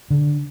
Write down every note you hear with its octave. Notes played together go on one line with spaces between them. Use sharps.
D3